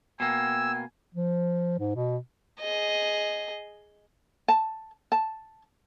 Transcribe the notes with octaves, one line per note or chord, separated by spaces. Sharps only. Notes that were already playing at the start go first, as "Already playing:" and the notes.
B2 A#3 G5 G#5 E6
F3
G#2
B2
G#4 D#5
A5
A5